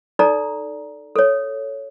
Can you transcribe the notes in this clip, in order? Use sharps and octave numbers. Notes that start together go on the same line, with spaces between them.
D#4 A4 D5 A#5
A4 C#5